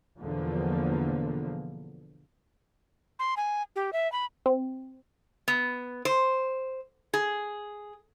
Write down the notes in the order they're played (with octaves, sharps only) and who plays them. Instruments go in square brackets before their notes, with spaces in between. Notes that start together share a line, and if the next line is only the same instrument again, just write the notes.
[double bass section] E2 B2 D3 F3 A#3
[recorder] C6
G#5
G4
E5
B5
[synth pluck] C4
[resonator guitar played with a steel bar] B3
C5
G#4